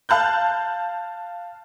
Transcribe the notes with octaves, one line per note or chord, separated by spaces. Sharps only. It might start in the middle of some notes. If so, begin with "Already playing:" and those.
F5 A5 F#6 G6